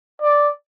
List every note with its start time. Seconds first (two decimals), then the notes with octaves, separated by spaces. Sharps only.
0.22 D5